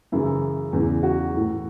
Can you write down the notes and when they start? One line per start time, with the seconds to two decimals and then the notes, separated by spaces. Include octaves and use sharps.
0.12 F#2 C#3 E3 E4
0.73 E2 C#3 E3
1.03 F#4
1.33 A2 E3